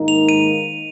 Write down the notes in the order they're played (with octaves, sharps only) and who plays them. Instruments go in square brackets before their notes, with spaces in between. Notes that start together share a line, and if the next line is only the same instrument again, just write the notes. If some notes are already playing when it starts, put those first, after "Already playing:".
Already playing: [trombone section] G#2 D#3 A#3 D#4 A#4
[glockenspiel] F7
D#7